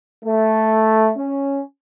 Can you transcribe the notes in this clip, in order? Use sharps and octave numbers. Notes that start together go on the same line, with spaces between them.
A3
C#4